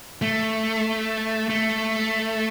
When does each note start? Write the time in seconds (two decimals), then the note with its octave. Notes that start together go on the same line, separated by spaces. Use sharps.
0.22 A3
1.50 A3